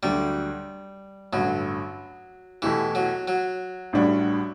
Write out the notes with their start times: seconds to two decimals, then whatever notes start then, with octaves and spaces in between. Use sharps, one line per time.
0.03 D2 D3 F#3 G3
1.32 A1 G2 D3 F#3
2.62 E2 B2 E3 A3 E4 G4
2.95 F#3
3.28 F#3
3.93 A1 A2 G3 D4 F#4